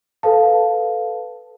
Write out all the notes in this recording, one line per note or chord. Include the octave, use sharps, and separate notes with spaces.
A4 B4 F5 A5